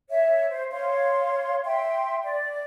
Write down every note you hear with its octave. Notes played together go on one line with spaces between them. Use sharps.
C#5 E5
C5
C#5 F5 C6
E5 G5 C6
D5